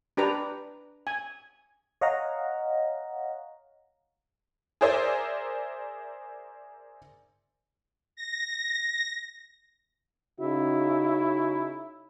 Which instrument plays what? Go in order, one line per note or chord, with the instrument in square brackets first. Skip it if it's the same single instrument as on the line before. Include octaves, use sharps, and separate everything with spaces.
[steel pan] D4 G4 B4 A#5
G#5
[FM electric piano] C#5 D#5 F5 F#5 A#5
[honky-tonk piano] G#4 A#4 C5 D5 E5 G#5
[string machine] A#6
[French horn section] C#3 D#4 F#4 [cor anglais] E4